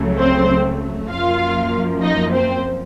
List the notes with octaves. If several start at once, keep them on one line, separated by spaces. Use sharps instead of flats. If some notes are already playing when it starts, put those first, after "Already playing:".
Already playing: C#2 C#3 F#3 A3
C4 C5
F#2 F3 A#3 F4 F5
D#4 D#5
C4 C5